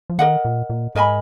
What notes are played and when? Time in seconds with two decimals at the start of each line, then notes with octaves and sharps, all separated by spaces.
0.10 F3
0.19 D#3 A#4 D#5 F#5
0.45 A#2
0.70 A#2
0.95 G#2 A#4 D#5 G#5 B5